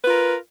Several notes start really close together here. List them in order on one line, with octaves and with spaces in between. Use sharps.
B4 F4 A#4